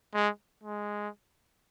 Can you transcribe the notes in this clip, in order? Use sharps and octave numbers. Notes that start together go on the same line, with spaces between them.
G#3
G#3